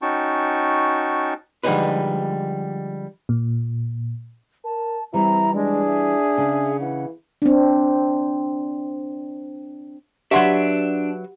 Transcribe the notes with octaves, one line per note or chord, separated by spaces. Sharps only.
C#4 D#4 F#4 G5 A5 C#6
D3 F3 G3 G#3 D#4 B4
A#2
A#4 A5
E3 G3 C4 E4 A#5
G#3 D4 G#4
E5
C#3
E3 F#5
C4 D4
F#3 D4 G4 B4 E5 F#5 C6